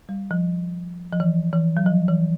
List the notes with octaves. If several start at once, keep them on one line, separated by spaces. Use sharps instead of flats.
G3
F3
F3
E3
E3
F#3
F3
E3